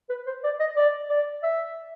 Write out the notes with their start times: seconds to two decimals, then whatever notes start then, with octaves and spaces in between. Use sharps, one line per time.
0.09 B4
0.26 C5
0.44 D5
0.60 D#5
0.76 D5
1.09 D5
1.43 E5